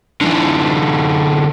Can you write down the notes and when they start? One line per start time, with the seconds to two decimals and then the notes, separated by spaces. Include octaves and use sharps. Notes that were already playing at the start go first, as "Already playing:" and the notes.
0.21 D3 E3